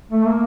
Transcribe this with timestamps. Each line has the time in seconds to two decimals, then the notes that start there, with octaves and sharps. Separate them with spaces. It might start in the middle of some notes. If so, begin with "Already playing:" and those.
0.11 A3
0.26 A#3